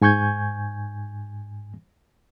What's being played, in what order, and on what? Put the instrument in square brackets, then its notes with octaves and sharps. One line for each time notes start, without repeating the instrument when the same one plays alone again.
[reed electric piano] G#2 G#5 C#6 G6 G#6